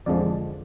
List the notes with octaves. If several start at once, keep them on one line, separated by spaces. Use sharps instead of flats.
F2 D3 F3 G#3 D5